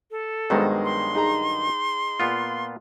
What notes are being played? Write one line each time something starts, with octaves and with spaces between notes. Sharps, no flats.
A4
G2 D#3 F#3 G#3 B3 C5
C6
D#4 G#4 A#5
A#2 B3 F4